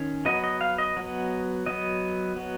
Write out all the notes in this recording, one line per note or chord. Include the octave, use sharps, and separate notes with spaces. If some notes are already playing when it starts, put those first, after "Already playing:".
Already playing: D#3 C#4
F#3 B3 D#5
D#5
F5
D#5
F#3 B3
F#3 B3 D#5
F#3 B3